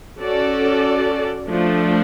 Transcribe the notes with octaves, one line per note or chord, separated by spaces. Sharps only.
C#4 F#4 A4 D5
F3 A3 D4